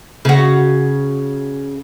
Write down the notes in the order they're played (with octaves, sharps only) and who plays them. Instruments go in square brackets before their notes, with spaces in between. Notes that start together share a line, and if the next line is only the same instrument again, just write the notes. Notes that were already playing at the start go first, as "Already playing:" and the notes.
[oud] C#3 F#4